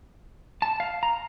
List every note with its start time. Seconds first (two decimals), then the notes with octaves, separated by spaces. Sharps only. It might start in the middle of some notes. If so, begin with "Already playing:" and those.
0.62 A5
0.80 F5
1.03 A#5